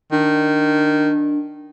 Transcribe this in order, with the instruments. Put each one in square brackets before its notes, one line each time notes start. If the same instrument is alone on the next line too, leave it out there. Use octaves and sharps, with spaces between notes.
[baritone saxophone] D#3 [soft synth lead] D4